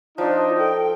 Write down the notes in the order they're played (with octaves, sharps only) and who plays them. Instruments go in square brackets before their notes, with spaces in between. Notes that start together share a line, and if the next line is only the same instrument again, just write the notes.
[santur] F3 [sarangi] D4 [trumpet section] D#4 [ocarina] F4
[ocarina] A4 [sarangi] G5